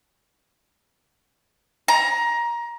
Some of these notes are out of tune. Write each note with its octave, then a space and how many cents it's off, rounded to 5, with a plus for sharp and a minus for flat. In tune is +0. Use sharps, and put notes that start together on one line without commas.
A#5 +20